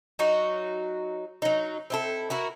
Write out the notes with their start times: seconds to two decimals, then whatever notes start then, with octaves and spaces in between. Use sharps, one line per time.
0.19 F#3 D#4 F#4
1.42 F#3 D#4
1.90 C4 E4 A4
2.30 E4 F#4 A#4